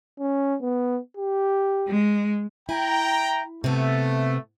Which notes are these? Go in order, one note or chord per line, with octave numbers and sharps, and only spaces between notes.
C#4
B3
G4
G#3
E4 G5 A#5
C3 A3 B3